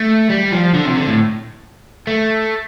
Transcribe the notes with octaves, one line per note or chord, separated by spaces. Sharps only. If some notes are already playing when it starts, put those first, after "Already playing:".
Already playing: A3
G3
F3
D3
C3
D3
A2
A3